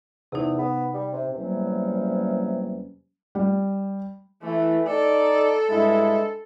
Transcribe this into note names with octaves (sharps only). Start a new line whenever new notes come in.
E2 C3 D#4
B3
G3
C3
E2 C3 F#3 G3 A#3 C#4
G3
E3 A3
D#4 A4 D5
G2 G#3 E4